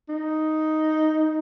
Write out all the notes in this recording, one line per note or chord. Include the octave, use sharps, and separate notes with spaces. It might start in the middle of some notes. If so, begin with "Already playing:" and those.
D#4